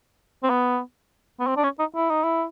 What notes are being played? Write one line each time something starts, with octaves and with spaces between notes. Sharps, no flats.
C4
B3
B3
C4
D4
C#4
D#4
E4
D#4
E4